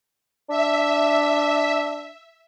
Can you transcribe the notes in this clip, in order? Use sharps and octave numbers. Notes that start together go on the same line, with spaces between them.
D4 E5